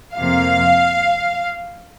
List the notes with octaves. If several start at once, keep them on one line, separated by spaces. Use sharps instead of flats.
F2 C3 F3 A#3 F5